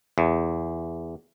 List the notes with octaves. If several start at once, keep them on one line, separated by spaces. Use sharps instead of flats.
E2